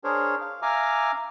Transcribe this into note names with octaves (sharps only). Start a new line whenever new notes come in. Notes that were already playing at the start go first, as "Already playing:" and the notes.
D4 G#4 A#4 C5 C#5
F5
E5 F5 G#5 A#5 D6 F6